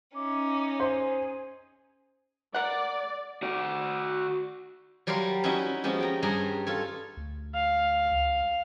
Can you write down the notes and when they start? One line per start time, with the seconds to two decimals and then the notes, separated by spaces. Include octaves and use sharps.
0.15 C#4 D#4 E5 D6
0.80 G#4 C5 G#5
2.54 A#4 D5 F#5
3.43 F#4 D5
5.07 F#3 G3 G4 A#4 F5 C6
5.44 C#4 D#4 E4 F#4 B4
5.84 F3 G#3 B3 C#4 G4
6.01 G5 A#5
6.22 G2 G3 G4 G#4 A#5
6.67 F4 A4 C#5
7.17 D2
7.55 F5
8.11 C#2